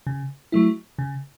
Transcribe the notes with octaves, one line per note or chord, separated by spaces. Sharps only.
C#3
F#3 A3 E4
C#3